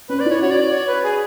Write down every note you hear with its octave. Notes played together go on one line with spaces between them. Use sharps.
C#4 B4
D5
E4 C#5
F#4 C#5
D5
D5
C#5
B4
G#4